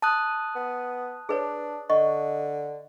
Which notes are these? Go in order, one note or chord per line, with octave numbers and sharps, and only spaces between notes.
A5 D#6 F#6
B3
D4 G#4 B4 C#5
D3 D#5 C#6